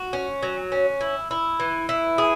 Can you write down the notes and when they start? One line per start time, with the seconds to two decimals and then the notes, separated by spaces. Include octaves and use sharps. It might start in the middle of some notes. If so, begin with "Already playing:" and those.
Already playing: F#4
0.13 C#4
0.43 F#3
0.72 C#4
1.01 E4
1.31 E4
1.60 E3
1.89 E4
2.18 G#4